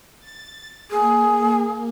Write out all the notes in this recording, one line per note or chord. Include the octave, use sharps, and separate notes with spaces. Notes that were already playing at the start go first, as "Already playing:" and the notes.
A6
A#3 G#4